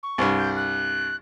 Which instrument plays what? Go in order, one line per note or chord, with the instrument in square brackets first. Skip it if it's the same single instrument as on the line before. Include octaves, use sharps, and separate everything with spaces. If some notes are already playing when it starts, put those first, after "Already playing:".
[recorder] C#6
[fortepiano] C2 G2
[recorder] G6
F#6